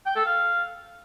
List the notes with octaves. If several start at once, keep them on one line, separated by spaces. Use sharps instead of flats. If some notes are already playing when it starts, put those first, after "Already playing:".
G5
A4
F5